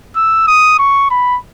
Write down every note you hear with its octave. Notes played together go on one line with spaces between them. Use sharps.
E6
D#6
C#6
B5